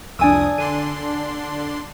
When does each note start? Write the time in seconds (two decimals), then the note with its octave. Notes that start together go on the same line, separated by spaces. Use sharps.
0.19 C2 F2 D4 G#5 D#6 E6
0.58 D3 D4 C6 D#7